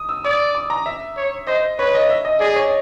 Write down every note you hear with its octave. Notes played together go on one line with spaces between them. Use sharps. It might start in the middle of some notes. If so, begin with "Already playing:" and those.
Already playing: D#6
E6
D5 D#6
D6
A#5
E5
C#5
C5 D#5
B4 C#5
D#5
E5
D#5
G#4 D5
C#5